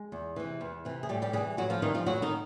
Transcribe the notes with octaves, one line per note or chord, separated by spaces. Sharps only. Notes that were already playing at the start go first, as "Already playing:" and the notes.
Already playing: G#3
E2
C3 E3
E2
C3 E3
G#4
A2 G3 G4
G3 G4
E3 G3 G#3 G#4
A2 F#3 F#4
F3 F4
D#3 E3 G3 D#4
F3 F4
A2 F#3 F#4
D#3 D#4